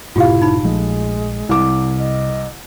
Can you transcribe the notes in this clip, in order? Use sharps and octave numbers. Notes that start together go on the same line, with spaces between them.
F#1 A2 C3 E4 F4 G4 F5
D#4 B5
A#1 F3 G#3 A3
C2 C3 D6
D#5